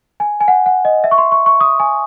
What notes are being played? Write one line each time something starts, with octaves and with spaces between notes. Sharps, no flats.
G#5
G#5
F#5
F#5
D#5
E5
C#6
C6
C#6
C#6
D#6
G#5